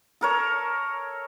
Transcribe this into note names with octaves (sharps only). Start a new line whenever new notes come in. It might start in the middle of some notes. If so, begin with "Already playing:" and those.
A4 A#4 C#5